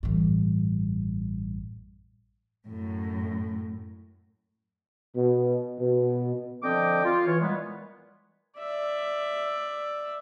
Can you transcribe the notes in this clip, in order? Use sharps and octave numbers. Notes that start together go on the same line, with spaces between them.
A1 G2
F#2 A2
B2
B2
D3 F3 C4 D#5 G5 D6
F4
E3 C#5
A#2 G3 G#3 B3
D5 E5